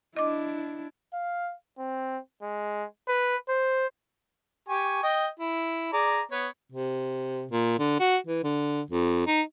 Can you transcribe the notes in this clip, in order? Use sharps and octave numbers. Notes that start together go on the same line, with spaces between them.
D4 E4 D#5 D6
F5
C4
G#3
B4
C5
G4 G#5 C#6
D#5 G5
E4
G#4 D5 A#5
B3 B4 C#5
C3
A#2
D3
F#4
E3
D3
F2
D#4